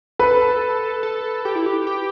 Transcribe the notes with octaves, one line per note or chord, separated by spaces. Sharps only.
A4 B4
A4
G4
E4
G4
G4